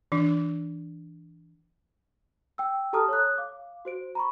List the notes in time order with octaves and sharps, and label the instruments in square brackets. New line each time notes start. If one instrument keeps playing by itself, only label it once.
[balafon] E3 D4
[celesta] G5 E6
G4 A4 A5 A#5 D#6 F6
C#5 D#6 F#6
F5 D6
F#4 C5 D7
A#5 B5 C#6